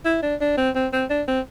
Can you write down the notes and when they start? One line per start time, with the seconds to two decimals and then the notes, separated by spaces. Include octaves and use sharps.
0.05 E4
0.23 D4
0.41 D4
0.57 C4
0.75 C4
0.93 C4
1.10 D4
1.28 C4